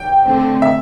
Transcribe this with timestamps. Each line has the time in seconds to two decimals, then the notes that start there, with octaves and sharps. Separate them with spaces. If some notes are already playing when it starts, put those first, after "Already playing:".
Already playing: G5
0.26 D3 A3 C4
0.62 E5